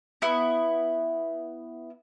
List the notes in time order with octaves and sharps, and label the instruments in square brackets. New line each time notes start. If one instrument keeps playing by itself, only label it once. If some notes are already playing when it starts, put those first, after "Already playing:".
[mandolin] B3 E4